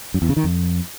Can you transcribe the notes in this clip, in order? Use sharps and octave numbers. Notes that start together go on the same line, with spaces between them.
F#2
E2
C#3
D#3
F2